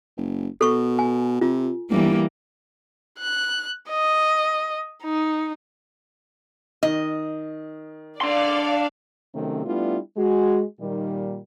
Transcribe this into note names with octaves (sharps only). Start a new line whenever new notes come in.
F#1
B2 A4 C#6
G#5
C3 F4
G1 E3 G3 A#3
F#6
D#5
D#4
D#3 D#5
D4 D5 F5 C6
C3 D#3 F#3 A3 C4 C#4
G3 A3 B3 D4 E4 F4
G#3 F#4
A#2 D#3 G3